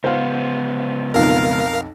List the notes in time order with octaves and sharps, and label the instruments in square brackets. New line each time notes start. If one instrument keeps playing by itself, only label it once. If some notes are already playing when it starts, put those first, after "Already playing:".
[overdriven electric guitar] C#2 B3 [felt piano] C5 F5
[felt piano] B1 F2 [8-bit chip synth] A#4 F5